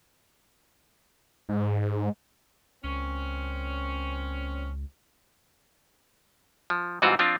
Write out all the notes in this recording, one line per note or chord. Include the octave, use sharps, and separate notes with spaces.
G#2
C#2 A#2 C4 C#4
F3
G#2 E3 G3 C4 F4 F#4
F3 C4 D4 F4